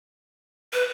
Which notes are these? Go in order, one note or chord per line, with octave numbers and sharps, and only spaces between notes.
B4